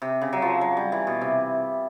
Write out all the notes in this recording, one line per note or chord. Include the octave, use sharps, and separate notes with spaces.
C3
C#3
F#3
F3
F#3
G3
E3
B2
C3